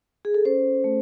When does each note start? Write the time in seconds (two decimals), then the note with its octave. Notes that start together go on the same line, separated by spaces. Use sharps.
0.25 G#4
0.34 A4
0.45 C#4 C5
0.84 A3